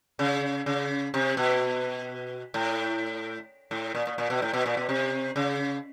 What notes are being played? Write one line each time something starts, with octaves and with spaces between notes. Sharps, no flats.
C#3
C#3
C3
B2
A2
A2
A#2
A#2
A#2
B2
A2
B2
A#2
B2
C3
C#3